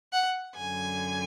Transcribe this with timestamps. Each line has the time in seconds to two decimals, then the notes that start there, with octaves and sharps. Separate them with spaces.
0.12 F#5
0.56 F#2 D3 G#5